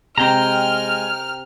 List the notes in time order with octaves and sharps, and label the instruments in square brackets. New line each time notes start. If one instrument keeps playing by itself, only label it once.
[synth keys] C3 C4 [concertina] G#3 G#5 [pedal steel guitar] G5 A#5 [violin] F6